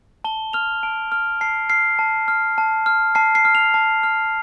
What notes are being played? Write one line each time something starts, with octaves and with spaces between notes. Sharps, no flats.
A5 G7
F6 F7
A5 D7
F6
A5 C7
F6 C7
A5
F6
A5
F6
A5 C7
C7
F6
F7
A5
F6